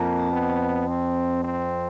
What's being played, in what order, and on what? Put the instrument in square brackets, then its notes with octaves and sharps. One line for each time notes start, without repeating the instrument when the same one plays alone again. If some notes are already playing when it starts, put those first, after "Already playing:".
Already playing: [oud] F2 [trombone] A#3
[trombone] B3
C4
C4